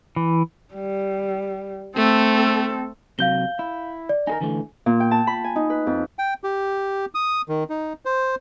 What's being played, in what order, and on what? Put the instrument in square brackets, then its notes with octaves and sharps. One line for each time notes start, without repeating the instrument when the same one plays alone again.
[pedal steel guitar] E3
[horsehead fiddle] G3
[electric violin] A3 [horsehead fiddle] C4 A4
[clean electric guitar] C3 F#3 [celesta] F5 G6 G7
[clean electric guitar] E4
[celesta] D5
[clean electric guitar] D#4 G#4 A#4 [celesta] G#5
[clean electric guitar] D3 E3 A3
[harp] A#2
G5
A5
B5
G#5
D#4
B4
F2
[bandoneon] G5
G4
D#6
D#3
D#4
C5